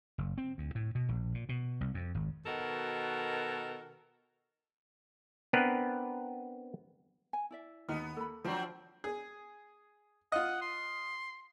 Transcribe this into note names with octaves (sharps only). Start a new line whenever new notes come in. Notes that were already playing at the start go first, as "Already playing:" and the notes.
F#1
C4
D2
A2
B2
A#1
A#2
B2
C2
F2
G#1
B2 D#3 F#4 A4 A#4
B3 C4 D4 A#4 B4
G#5
E4 D5 E5
D#2 B3 D#4 F6
A#3 A4 B5
F3 F#3 C4 D4
G#4
F4 D#5 F#5
C6